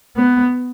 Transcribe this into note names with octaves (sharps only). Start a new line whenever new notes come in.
B3